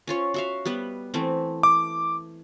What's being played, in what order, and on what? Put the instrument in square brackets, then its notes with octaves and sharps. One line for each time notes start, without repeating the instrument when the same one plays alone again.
[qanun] C#4 F4 C#5
F#4 E5 F5
G3 B3 B4
E3 A3 C4
[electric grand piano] D6